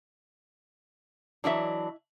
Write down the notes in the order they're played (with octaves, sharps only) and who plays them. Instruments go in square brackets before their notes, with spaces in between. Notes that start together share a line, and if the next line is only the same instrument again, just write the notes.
[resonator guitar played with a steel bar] E3 F#3 D4 [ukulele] E4 D#5 E5